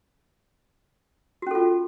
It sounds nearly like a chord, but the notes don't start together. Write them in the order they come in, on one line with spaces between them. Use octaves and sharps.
F#4 C#4 A4 F4